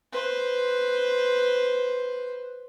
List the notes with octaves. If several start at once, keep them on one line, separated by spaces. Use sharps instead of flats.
B4 C5